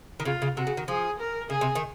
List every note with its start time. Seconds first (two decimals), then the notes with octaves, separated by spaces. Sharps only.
0.20 D#3
0.25 C#3 F4
0.42 C#3
0.57 C3 F#4
0.67 C#3
0.77 D#3
0.88 F3 G#4
1.20 A#4
1.50 C#3 G#4
1.61 C3
1.75 D#3